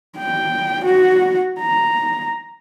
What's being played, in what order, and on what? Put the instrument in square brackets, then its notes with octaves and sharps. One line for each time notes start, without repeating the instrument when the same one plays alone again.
[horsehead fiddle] G5
F#4
A#5